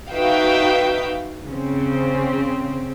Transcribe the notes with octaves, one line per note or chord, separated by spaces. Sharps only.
D#4 F#4 B4 E5 F5 G5
C#3 C4